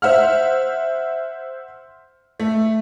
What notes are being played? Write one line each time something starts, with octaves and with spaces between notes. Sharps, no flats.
C5 E5 F#5 F6
A3